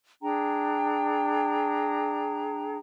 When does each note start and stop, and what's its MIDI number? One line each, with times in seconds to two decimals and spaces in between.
0.22 2.76 62
0.22 2.76 68
0.22 2.76 79
0.22 2.76 82